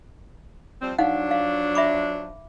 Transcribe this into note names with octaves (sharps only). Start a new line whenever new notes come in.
F3 G3 C4
F3 F#3 D4 D#4 F5 F#5
F5
E5 B5 D6